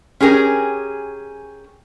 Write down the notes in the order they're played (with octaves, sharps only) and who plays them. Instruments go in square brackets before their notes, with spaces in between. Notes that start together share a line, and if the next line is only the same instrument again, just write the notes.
[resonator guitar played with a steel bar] C#4 G4 G#4 A#4